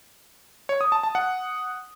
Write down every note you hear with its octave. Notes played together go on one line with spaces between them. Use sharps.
C#5
D#6
A5
A5
F#5